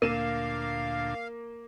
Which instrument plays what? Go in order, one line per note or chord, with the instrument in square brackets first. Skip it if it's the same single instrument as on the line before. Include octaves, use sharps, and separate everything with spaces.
[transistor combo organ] D2 A#2 D4 [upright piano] A#3 E7 [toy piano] A#4 [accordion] F5